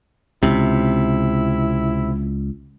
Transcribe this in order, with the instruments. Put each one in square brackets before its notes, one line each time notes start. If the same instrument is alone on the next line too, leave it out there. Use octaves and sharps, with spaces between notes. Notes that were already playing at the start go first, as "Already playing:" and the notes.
[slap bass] C#2 [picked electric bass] C3 [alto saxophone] E4